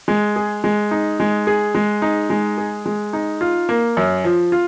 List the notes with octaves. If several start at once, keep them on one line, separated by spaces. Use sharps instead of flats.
G#3
G#4
G#3
D#4
G#3
G#4
G#3
D#4
G#3
G#4
G#3
D#4
F4
A#3
F#2
F3
F4